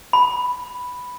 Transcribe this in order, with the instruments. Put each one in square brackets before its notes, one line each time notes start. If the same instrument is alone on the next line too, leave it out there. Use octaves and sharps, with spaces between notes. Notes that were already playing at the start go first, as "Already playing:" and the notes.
[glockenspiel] B5